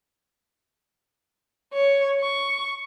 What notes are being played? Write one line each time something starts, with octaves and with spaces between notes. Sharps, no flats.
C#5
C#6